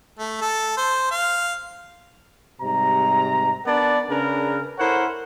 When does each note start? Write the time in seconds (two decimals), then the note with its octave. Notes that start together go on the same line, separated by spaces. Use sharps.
0.19 A3
0.42 A4
0.77 C5
1.11 F5
2.61 G#2 C3 G3 A#5
3.66 B3 D4 A#4 D5 F#5 A5
4.10 C#3 D4 G#4 A#4 B4
4.79 E4 A4 A#4 C5 C#5 F#5